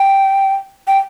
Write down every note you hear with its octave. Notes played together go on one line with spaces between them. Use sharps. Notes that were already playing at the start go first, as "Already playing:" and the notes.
Already playing: G5
G5